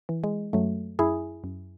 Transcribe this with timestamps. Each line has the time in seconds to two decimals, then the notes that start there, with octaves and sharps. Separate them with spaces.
0.09 E3
0.24 G#3
0.53 F#2 F#3 A3
0.99 F#2 E4 G#4
1.44 F#2